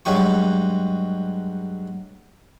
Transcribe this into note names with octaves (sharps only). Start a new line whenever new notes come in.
G2 F#3 G#3 G4 C#6